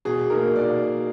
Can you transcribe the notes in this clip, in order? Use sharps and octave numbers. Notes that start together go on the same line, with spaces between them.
B2 G#4
A#3 D#4 A#4
B2 D5